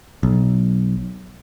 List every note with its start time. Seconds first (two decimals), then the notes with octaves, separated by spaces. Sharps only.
0.23 B1